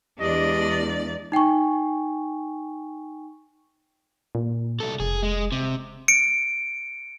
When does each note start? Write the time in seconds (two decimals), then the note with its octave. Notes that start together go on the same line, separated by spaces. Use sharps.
0.20 E2 G#3 D4 G4 D5 D#5
1.32 D#4 G5 G#5 C#6
4.35 A#2
4.80 C2 A4
5.00 F1 G#4
5.23 G#3
5.52 C3
6.08 C#7 D7